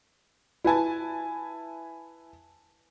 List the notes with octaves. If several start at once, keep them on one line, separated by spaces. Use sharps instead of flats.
E4 B4 G#5 A5